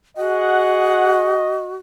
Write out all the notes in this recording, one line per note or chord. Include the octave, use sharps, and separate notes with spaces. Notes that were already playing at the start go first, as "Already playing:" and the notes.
F#4 G#4 D#5 F#5